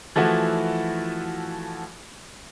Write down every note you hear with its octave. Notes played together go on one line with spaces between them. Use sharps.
E3 F3 A3 E4 F#4